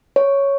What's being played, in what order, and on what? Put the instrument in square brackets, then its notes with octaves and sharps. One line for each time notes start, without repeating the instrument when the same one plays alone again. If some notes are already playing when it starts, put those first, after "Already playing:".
[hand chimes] C#5